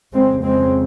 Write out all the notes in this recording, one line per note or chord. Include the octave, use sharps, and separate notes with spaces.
F2 C#3 G#3 C4
G#3 C4